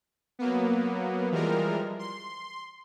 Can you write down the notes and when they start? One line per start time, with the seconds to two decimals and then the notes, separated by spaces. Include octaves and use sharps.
0.39 F#3 A#3 B3
1.31 E3 F3 G3 G#3 A#4
1.99 C6